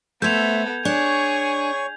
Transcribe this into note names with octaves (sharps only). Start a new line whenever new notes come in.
A3 B3 A4 C5 E5 G6 G#6 F7
D4 G#4 C#5 C#6